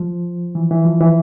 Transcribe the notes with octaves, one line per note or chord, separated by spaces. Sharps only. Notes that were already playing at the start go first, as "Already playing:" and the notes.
Already playing: F3
E3
E3
F3
E3